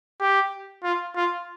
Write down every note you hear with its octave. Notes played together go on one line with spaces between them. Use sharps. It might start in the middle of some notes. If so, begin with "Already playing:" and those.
G4
F4
F4